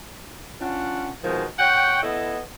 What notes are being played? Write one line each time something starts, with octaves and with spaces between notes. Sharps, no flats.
C#4 D4 F4 F#5
B2 D#3 F3 G#3
C#5 F#5 G5
B3 E4 A4 D#5